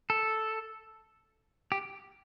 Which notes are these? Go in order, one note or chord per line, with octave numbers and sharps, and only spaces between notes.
A4
G4